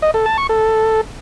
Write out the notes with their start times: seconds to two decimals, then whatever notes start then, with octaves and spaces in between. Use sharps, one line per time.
0.02 D#5
0.14 A4
0.26 A5
0.38 C#6
0.49 A4